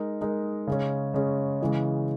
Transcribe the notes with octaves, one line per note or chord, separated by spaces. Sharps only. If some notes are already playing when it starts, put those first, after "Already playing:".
Already playing: G#3 D#4 A#4
G#3 D#4 A#4
C#3 G#3 C#4
C#3 G#3 C#4
C#3 E3 G#3